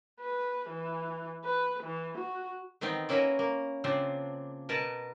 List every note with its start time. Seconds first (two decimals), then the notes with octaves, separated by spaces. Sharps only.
0.20 B4
0.70 E3
1.44 B4
1.84 E3
2.19 F#4
2.81 D#3 E3 B3 C4 D#4
3.09 A#3 C#4 E4 F#4 A#4 B4
3.39 A#3
3.84 C#3 F3 C4 D4
4.69 B2 A#4 B4 A5